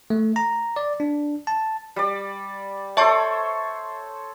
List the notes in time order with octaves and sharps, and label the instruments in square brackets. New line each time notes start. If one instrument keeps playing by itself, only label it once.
[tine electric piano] A3
A#5
D5
D4
A5
[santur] G3 D5
[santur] A4 C5 C#5 [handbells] E5 A5 C#6